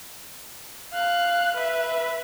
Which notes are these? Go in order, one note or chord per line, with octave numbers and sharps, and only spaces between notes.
F5 F#6
B4 E5